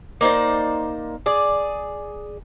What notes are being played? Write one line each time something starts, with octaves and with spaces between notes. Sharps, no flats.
A#3 D#4 C5 D5
G#4 D5